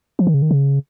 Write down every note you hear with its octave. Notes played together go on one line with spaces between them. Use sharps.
F3
D#3
C#3
D#3
C#3